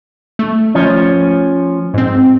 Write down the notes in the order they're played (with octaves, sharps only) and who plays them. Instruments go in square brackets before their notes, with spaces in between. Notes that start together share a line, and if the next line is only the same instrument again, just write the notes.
[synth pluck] A3
[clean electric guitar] F3 C#4
[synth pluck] G#2 C4